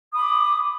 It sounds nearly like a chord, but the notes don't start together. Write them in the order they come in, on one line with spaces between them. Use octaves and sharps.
D#6 B5 D6